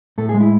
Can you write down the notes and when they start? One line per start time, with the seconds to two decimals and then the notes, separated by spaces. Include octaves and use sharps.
0.18 A2 A4
0.29 G#4
0.34 G#3
0.40 E4